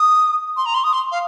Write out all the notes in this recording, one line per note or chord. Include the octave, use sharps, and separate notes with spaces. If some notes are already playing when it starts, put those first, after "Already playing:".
Already playing: D#6
C6
A#5
C6
D#6
C6
F5